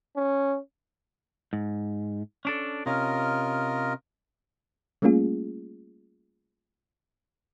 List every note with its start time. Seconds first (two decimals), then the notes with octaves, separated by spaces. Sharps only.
0.16 C#4
1.53 G#2
2.45 C#4 D4 A4
2.86 C3 C#4 F4 A#4 D#5
5.02 G3 A3 A#3 C#4 F4 G#4